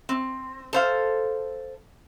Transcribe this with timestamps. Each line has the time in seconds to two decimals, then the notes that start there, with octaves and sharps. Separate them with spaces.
0.09 C4
0.73 A4 C5 F5